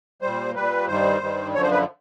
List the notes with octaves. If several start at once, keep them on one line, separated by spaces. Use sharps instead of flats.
A#2 G3 C5
A#2 G3 B4
G2 D#3 G3 C5
G2 D#3 G3
F#2 D3 F3 C#5
C5
B4